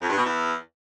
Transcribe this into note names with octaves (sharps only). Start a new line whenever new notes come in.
F2
G2
B2
E2